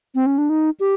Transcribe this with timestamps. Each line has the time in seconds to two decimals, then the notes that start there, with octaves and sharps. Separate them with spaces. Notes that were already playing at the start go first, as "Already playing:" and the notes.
0.15 C4
0.26 C#4
0.38 D4
0.50 D#4
0.80 G4